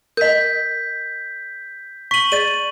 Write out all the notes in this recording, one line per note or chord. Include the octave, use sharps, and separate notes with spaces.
A#4 D#5 G6 B6
C#6 B6 D#7 F#7
G#4 D5 A6 D#7